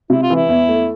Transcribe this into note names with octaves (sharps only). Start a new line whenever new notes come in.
C3 E4
F4
E3 E4
E2
A3